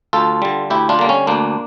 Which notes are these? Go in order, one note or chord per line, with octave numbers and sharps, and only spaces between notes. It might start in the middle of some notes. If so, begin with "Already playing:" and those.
D2 F4 A4
D3 G3
D2 E4 G4
D4 F4
D3 G3 A#3
C#4
D2 A#3 D4